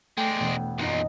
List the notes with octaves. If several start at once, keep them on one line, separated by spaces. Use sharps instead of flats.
G#3 A3 D4 G5
E1 B3
B1 F#2 A#2 D#4 D#5